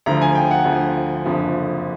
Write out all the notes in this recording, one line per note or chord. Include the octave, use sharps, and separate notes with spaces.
D2 D3 F3 A#5
G#5
G5
F#5
D2 D3 F3
F#1 F2 D3 F3